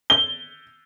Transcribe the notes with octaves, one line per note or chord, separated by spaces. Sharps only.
G7